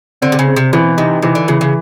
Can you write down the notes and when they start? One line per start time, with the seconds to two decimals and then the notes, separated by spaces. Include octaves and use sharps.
0.22 D3 C4
0.32 C3
0.39 C#3
0.48 C4
0.56 C3
0.73 B2 E3
0.97 C3 D#4
1.22 C3 E3
1.35 D3
1.48 C#3 E3
1.61 C#3